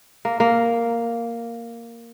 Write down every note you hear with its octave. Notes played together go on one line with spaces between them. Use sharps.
A#3
A#3